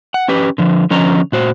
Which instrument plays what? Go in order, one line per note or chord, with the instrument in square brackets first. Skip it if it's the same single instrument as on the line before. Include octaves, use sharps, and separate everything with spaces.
[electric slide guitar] F#5
C#4 G4 B4
D3 F3
D3 F3 C#4 D#5 A#5
A#2 F#4 C5